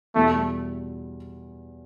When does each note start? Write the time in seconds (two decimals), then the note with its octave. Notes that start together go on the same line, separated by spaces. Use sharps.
0.15 E2 B2 G3 A3